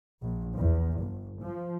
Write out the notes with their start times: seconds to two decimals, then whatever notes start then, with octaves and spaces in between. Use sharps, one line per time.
0.21 A#1
0.56 E2
0.99 G1
1.40 F3